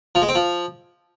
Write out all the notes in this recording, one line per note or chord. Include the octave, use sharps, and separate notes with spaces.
F3
G#3
C4
F3